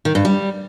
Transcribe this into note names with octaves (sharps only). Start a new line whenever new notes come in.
D#3
G2
G3